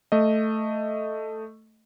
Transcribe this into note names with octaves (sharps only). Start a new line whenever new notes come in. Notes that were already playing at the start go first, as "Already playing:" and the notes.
A3 D#5